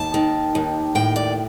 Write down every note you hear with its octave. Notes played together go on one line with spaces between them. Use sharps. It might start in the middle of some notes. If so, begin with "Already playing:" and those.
Already playing: D#2 A5
D#3
D#2
A2 G5
D5